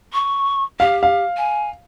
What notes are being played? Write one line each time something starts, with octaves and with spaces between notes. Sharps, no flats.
C#6
G4 F5
F5
G#5